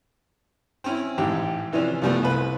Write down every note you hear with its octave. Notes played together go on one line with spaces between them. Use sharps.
C4 C#4 E4
A1 G#2 G4
C3 E3 F3 C#4 D4
C2 F3 G3 A3 B3
C2 B4